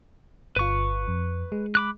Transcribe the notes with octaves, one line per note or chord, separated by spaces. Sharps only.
G1 F4 B4 C#6
F2
G#3
B5 D6 F#6